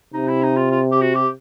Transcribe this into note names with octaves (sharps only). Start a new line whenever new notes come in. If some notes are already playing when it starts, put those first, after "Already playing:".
C3 D#4
E4
D#4
F4
F4
G4
F#4
G4